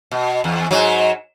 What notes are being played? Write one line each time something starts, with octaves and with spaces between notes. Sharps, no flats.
B2
E2
G#2 F#3